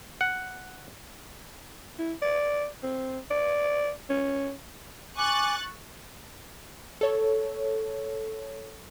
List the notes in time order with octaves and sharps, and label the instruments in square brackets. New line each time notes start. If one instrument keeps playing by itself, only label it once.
[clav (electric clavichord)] F#5
[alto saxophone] E4
D5
C4
D5
C#4
[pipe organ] G#5 D6 [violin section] C#6 F#6 A6
[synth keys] A4 C#5